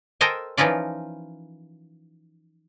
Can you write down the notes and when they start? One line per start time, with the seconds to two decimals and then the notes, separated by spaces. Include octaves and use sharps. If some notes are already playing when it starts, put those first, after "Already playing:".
0.21 A4 A#4 C5 D#5 G5 G#5
0.57 E3 F3 C#4 D#4 F4 D5